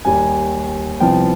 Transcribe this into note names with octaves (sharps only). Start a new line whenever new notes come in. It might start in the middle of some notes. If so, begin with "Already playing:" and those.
D#2 D#3 G3 G#5
C2 C3 F3 B3 G5